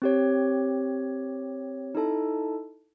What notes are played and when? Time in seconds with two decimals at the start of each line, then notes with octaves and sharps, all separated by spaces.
0.02 C4 G4 C#5
1.95 D#4 E4 A4 A5